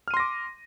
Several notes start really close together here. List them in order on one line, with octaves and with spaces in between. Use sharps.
F6 D#7 C6 A#6 D6